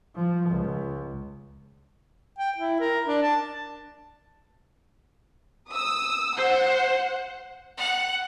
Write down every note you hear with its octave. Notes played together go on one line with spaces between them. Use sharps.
F3
C#2
G5
E4
A#4
D4
A5
D#6 E6
C5 F#5
F#5